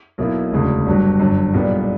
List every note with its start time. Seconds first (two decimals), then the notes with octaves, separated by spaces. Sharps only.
0.18 B1 B2 A#3 E4
0.52 E1 D2 C#3
0.86 G1 G2 F#3
1.20 G1 F#2 D3
1.53 B1 A#2 G3 B3